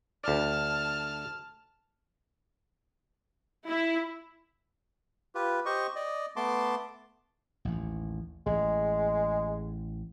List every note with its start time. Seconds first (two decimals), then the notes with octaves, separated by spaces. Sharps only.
0.24 D2 D5 A5 F6
3.67 E4
5.35 F4 G4 B4
5.66 G4 C5 D#5 C#6
5.96 D5 D#5
6.36 A3 B3 A5 C6 D6
7.65 A1 D#2
8.46 A1 G#3